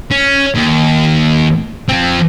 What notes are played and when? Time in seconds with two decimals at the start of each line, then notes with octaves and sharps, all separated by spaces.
0.11 C#4
0.55 D#2
1.89 F3 C4